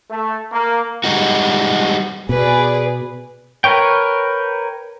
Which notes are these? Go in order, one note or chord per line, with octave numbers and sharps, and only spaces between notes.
A3
A#3
G3 G#3 D#4 F#4
B2 G#4 B4 D5
A#4 B4 C#5 G5